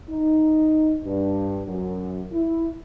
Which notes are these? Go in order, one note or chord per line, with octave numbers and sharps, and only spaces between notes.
D#4
G2
F#2
E4